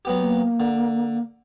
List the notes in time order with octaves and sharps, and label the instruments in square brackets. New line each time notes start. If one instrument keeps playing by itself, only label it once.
[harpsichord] F#3 B3 G4
[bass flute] A#3
[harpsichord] D3